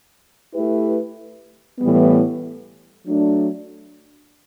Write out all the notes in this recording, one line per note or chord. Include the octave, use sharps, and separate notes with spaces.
A3 E4 G4 B4
A2 E3 G3 B3
F#3 A3 D4